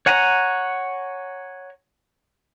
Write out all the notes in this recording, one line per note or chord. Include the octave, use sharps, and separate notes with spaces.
C#5 F#5 G#5 A#5